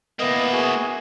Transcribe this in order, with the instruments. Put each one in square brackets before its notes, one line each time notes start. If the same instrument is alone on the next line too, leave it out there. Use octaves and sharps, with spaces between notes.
[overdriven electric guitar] A#3 E4 [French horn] B3 [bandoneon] D#5
[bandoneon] F#4 G#4